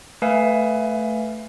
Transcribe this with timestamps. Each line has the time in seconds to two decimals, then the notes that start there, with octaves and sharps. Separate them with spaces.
0.22 A3 B4 E5 F5 G#5